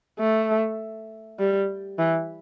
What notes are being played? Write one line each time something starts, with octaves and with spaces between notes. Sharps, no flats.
A3
G3
E3